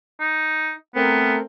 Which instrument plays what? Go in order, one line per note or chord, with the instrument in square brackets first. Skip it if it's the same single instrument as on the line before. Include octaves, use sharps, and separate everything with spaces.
[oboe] D#4
[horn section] A3 C4 A#4 [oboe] B3